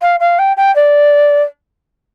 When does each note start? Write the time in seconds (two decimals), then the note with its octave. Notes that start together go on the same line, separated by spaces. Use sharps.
0.02 F5
0.20 F5
0.39 G5
0.57 G5
0.76 D5